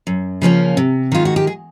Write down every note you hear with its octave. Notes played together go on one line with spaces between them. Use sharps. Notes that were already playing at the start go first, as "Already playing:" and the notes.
F#2
C#3 F3 A#3 C#4
C3
D#3 G#3 F4
F#4
G4
G#4